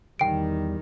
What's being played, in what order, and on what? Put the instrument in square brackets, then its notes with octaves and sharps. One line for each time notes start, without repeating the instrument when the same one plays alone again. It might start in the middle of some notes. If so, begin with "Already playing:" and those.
[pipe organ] E2 G3 [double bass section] D#3 [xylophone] G5 D7